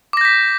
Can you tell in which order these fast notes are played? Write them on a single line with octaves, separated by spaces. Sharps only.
D6 A#6 G6 B6